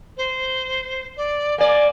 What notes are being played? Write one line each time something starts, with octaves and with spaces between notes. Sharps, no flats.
C5
D5
A#3 D5 G#5